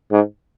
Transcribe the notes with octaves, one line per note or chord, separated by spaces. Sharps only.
G#2